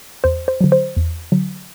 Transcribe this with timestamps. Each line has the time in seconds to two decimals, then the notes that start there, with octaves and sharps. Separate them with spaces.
0.24 E2 C5
0.48 C5
0.61 D3 F#3
0.72 C5
0.97 E2
1.32 D3 F#3